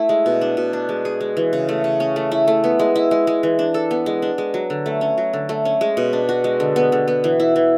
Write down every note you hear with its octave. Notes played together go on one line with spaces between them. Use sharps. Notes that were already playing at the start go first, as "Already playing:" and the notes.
Already playing: A3 D4 E4
G#3
B2
D4
B2
D4
G#3
G#4
G#3
E3
C#3
A3
C#3
C#4
A3
E4
A3
B3
G#3
E4
G#3
G#3
E3
D4
A4
B3
G#3
D4
G#3
F#3
D3
A3
C#4
F#3
D3
A3
C#4
G#3
B2
D4
F#4
G#3
D3
B3
D3
B3
E3
E4
E3